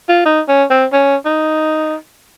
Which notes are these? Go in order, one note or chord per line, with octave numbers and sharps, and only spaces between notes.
F4
D#4
C#4
C4
C#4
D#4